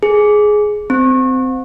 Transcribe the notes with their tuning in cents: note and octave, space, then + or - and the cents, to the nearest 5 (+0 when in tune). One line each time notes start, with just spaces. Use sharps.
G#4 +10
C4 -20